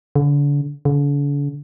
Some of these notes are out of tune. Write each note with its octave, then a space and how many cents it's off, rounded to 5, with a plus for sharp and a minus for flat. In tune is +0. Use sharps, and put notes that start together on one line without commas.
D3 -35
D3 -45